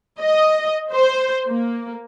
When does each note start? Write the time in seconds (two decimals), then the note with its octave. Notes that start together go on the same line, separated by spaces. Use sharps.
0.19 D#5
0.91 C5
1.47 A#3